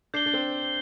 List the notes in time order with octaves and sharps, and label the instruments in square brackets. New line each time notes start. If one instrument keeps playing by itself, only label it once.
[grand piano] D4 [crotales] G6 C7 G7
[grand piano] D4
C4